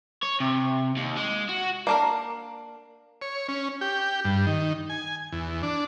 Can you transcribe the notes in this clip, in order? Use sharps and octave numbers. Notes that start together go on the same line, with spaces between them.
C#5
C3
D#2
G#3
F#4
A#3 D4 A#4
C#5
C#4
G4
G2
D#3
G#5
E2
D4